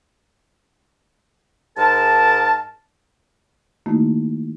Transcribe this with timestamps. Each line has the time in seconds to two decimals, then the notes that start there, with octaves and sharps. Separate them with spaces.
1.77 G#2 A#4 A5
3.86 D#3 A3 A#3 D#4 E4 F#4